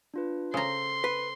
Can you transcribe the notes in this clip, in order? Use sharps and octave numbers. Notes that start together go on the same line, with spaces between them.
D4 F4 B4
C#3 A4 C5 A#5 C6
B4